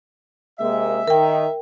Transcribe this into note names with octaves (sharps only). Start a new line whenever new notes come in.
C3 G#3 A#3 E5
D#3 A#4 G5